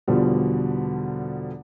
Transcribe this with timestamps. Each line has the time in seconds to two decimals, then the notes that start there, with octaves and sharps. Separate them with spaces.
0.08 E2 B2 D3 F3 G3